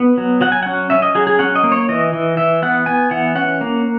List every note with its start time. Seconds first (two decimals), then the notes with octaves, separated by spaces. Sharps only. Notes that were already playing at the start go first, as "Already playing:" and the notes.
Already playing: B3
0.18 F#3
0.41 F#3 F#5
0.52 G#5
0.63 C#4 F#5
0.90 C#4 E5
1.02 D#5
1.15 F#3 G#4
1.27 G#4
1.39 C#4 F#5
1.55 D#5
1.64 A#3
1.72 C#5
1.89 E3 D#5
2.13 E3
2.37 E3 E5
2.62 B3 F#5
2.86 B3 G#5
3.11 E3 F#5
3.35 C#4 F#5
3.61 A#3